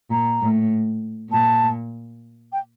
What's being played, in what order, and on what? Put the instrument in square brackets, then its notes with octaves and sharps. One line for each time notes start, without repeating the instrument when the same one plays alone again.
[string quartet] A#2 [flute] A#5
[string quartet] A2
[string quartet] A#2 [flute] A5
[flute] G5